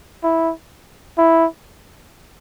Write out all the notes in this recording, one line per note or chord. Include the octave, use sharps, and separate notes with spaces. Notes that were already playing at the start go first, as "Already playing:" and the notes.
E4
E4